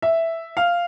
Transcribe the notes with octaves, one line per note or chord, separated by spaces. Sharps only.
E5
F5